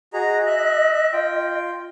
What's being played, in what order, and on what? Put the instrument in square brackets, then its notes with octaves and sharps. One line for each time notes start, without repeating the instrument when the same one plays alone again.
[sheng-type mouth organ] F#4 G#4 A#5 [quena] D#5
[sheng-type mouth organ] E5 F#6
F4 G5